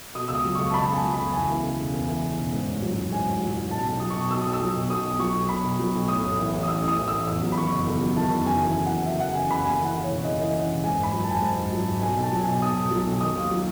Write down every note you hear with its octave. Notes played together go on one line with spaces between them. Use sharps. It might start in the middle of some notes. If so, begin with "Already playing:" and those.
B2 D#6
C#2 E6
D#6
F#3
C#2 C#6
A5
B2 B5
A5
C#2 G#5
F#3
B5
C#2
E2 G#5
E3
C#3
E1
E2
E3
C#3
E1
G#2
A1
F#3
A1
G#2 G#5
A1
F#3
A1
B2 A5
B1
F#3 D#6
C#6
B1
B2 E6
B1 D#6
E6
F#3
B1
B2 D#6
B1
F#3 C#6
B1
B2 B5
B1
F#3
B1
A2 D#6
A1
E3
A1
D#6
A2 E6
A1 D#6
E3
E6
A1
E2 E6
F#3
B5
D#3 C#6
F#1
E2
F#3
D#3 A5
F#1
F#2 G#5
E3
G#5
C#3
F#5
F#1
F#5
F#2 E5
E3 F#5
C#3 G#5
F#1 B5
D#2 G#5
E3
F#5
C#3
C#5
E1
D#2 D#5
E3 D#5
C#3
E1
G#2 G#5
G#1
B5
F#3
A5
G#1 G#5
A5
G#2
G#1
F#3
G#1
B2 G#5
B1
A5
F#3
B1 G#5
B2 D#6
B1
F#3
B1
D#3 D#6
D#2
F#3